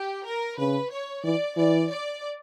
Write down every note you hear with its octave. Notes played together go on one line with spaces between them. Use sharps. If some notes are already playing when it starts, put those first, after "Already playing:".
Already playing: G4
A#4
C#3 B4
C#5
E3 D5
E3 D5
D5